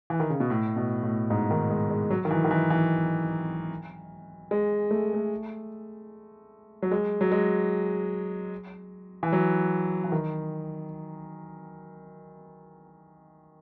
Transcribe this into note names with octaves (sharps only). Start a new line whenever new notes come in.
E3
D#3
C#3
B2
A2
B2
A2
G#2
D#3
G#3
G#3
F#3
D#3
E3
D#3
E3
E3
G#3
A3
A3
F#3
G#3
F#3
G#3
E3
F#3
E3
D#3